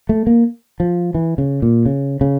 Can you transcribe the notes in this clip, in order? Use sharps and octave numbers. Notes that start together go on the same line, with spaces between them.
A3
A#3
F3
E3
C#3
A#2
C#3
C#3